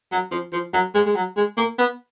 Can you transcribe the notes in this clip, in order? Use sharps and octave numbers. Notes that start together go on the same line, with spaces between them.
F#3
F3
F3
F#3
G#3
G#3
F#3
G#3
A#3
B3